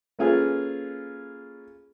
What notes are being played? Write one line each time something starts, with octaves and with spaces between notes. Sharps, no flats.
A#3 C#4 F4 G#4 A4 B4